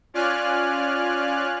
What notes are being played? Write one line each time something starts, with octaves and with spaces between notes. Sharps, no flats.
C#4 F4 D5 G#5 F6 F#6